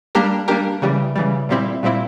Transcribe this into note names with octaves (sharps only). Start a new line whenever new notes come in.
G3 A#3 D4 G4 A#4
G3 A#3 D4 G4 A#4
C#3 E3 G3
C#3 E3 G3
A#2 G3 C4 E4
A#2 G3 C4 E4